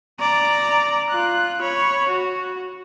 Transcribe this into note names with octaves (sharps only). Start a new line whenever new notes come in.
D5 A#5
F4 F#6
C#5 B5
F#4